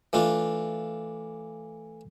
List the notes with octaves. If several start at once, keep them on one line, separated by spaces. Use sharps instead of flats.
E3 A3 D4 F4